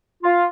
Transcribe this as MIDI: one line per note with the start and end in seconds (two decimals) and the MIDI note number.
0.24 0.45 65